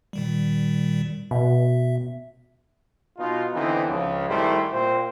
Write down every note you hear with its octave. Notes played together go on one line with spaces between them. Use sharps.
A#2 D#3 G3
B2 E5
B2 D#4 F4
D3 E3 B3 C4 D4 D#4
C#2 C#3 F3
G#1 G3 A3 E4 A#4 C5
A#2 C4 C5